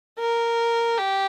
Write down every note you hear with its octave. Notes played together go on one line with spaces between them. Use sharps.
A#4
G4